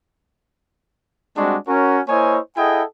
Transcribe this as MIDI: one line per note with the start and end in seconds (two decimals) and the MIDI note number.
1.37 1.58 55
1.37 1.58 56
1.37 1.58 60
1.37 1.58 62
1.37 1.58 66
1.68 2.01 61
1.68 2.01 66
1.68 2.01 70
2.09 2.39 58
2.09 2.39 64
2.09 2.39 72
2.09 2.39 73
2.09 2.39 75
2.09 2.39 80
2.57 2.83 64
2.57 2.83 68
2.57 2.83 69
2.57 2.83 75
2.57 2.83 78
2.57 2.83 79